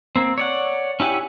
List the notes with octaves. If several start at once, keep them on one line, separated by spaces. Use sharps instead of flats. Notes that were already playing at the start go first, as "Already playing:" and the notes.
A#3 C4
C#5 D5 F#5
C#4 E4 G4 F#5 G#5